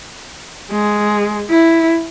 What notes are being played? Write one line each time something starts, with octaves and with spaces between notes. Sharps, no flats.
G#3
E4